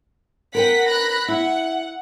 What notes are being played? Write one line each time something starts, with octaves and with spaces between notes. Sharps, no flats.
A#4 B4 F#5 G5 B6
B5 F#6 A#6
E4 F#5